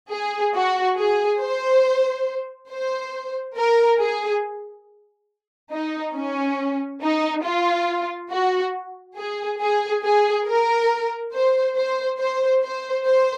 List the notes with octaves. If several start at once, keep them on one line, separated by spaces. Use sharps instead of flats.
G#4
F#4
G#4
C5
C5
A#4
G#4
D#4
C#4
D#4
F4
F#4
G#4
G#4
G#4
A#4
C5
C5
C5
C5
C5